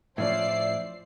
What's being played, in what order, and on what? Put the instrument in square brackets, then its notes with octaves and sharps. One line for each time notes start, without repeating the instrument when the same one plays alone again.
[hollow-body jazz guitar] A2 F3 C#4 [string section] C5 D5 C7 [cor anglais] E5